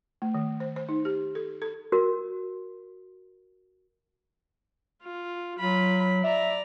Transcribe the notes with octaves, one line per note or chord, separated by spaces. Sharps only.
A3
D#3
C5
C5
D#4
G4
A4
A4
F#4 A#4
F4
F#3 F4 B5
D5 E5 A#5